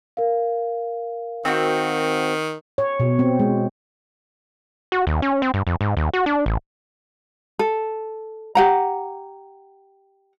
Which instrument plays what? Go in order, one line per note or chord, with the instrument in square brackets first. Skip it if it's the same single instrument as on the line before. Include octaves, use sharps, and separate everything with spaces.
[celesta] A#4 F5
[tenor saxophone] D#3 [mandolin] C4 F#4
[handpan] C#5
B2
C4
G#3
[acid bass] F#4
D#2
C#4
C4
G2
F2
G#2
D#2
F#4
D4
A1
[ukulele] A4
G4 F#5 A#5